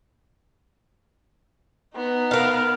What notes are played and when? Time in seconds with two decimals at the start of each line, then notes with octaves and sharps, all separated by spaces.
1.95 B3 D#4
2.31 A#4 F5